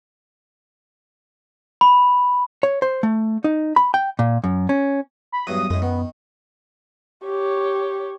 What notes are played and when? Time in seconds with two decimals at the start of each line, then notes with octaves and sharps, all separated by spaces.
1.81 B5
2.63 C#5
2.82 C5
3.03 A3
3.44 D#4
3.76 B5
3.94 G5
4.19 A#2
4.44 F#2
4.69 C#4
5.32 B5
5.47 E2 G2 F#3 D#6
5.70 F#2 A2 G#3
5.82 D#3 B3
7.24 G4 C#5